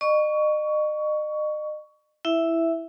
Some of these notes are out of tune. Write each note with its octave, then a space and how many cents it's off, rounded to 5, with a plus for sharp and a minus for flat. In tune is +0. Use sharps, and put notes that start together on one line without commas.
D#5 -40 C#6 +20
E4 +0 E5 +0